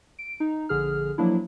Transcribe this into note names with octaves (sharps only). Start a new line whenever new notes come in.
D7
D#4
A#1 D3 G#4 F6
F3 F#3 A#3 D4 E4